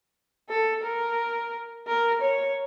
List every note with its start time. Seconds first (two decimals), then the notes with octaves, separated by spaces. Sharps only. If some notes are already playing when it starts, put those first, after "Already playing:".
0.49 A4
0.83 A#4
1.88 A#4
2.21 C#5